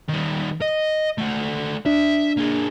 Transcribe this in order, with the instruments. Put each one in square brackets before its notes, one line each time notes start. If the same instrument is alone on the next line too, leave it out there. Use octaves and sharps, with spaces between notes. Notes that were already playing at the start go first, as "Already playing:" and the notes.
[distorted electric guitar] D#3 G3
D#5
A3 F#4
[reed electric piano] D4 [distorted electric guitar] E5
[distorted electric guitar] A#3 G#4